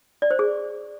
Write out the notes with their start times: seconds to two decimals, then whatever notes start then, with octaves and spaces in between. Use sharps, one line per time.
0.22 D5
0.31 C5
0.39 G#4